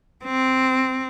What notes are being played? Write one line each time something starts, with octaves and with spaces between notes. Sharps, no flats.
C4